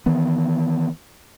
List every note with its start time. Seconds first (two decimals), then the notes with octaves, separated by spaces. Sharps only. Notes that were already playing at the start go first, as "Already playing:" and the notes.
0.06 D#3 E3 B3